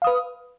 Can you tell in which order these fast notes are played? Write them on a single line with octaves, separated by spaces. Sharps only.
F5 D#6 B4